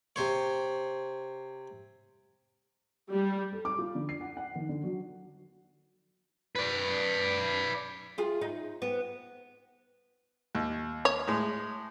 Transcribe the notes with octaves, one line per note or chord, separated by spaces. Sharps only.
C3 C5 C#5
G3
A4
D6
F4
D3
C7
F#5
F#5
D#3
D3
F#3
B4 D5
F4 G#4
D#4
B3
D#2
C#5
A2 G#3